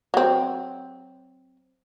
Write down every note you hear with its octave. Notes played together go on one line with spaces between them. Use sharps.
F#3 C4